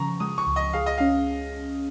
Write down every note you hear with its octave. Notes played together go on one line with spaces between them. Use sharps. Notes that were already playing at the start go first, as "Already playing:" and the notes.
Already playing: C#3 F3 A#5 C#6
G#3 D#6
C#6
C#2
D#5
G#4 F5
D#5
C#4 F5